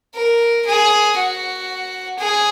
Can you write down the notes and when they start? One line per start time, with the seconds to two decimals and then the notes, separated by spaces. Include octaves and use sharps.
0.15 A#4
0.66 G#4
1.17 F#4
2.19 G#4